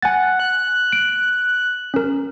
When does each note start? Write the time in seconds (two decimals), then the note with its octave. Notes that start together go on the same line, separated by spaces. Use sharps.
0.02 F#5 G#5 A6
0.40 F#6
0.92 D7
1.94 C#4 A#4